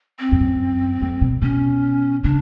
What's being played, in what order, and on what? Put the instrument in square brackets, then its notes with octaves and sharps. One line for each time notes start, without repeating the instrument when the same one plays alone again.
[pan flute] C4
[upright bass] F2
F#2
F2
B2
[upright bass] B2 [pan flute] C#4
[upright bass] C#3 [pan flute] D4